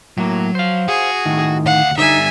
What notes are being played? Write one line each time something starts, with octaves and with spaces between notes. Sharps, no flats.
A2 F#3 A#3
C5 F5
F#4 G#4
A2 D#3
D2 F5 F#5
D3 G3 D#4 E5 G#5